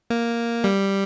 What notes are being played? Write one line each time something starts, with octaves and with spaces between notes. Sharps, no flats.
A#3
G3